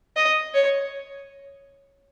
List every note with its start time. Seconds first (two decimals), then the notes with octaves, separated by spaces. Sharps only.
0.16 D#5
0.54 C#5